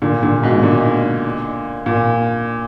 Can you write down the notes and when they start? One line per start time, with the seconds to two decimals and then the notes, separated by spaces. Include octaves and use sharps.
0.02 A#2 D3
0.23 A#2 D3
0.43 G#2 B2
0.63 A#2 D3
1.86 A#2